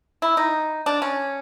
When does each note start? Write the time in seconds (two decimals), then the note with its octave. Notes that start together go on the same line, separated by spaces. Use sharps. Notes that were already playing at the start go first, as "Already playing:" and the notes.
0.22 E4
0.37 D#4
0.86 D4
1.02 C#4